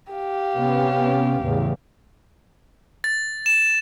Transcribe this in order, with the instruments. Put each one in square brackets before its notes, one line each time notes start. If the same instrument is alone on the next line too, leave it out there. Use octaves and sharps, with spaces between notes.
[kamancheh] G4 F5
[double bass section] C3 B3 C#4
E2 A2 C#3
[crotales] A6
E7